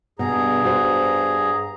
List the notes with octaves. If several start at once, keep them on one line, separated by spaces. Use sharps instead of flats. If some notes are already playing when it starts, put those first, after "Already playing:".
G2 B2 G#4 A#5
F#4 C5